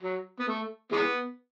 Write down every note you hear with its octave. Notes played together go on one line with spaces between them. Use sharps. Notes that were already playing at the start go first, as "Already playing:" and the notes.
F#3
B3
A3
E3 G#3 B3